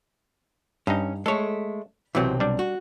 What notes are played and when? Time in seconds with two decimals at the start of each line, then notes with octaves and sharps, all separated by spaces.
0.87 G2 C#4 D#4
1.26 G#3 A3 A4 C#5
2.15 B1 C3 E3 F#3 C4
2.40 G3 D4
2.59 F#4